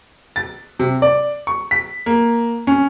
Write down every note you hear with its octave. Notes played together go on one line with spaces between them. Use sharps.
A6
C3
D5
C#6
B6
A#3
C#4